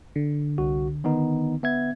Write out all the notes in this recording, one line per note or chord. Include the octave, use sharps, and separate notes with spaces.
D3
C2 F#4
D#3 B3 D#4
B3 E5 G#6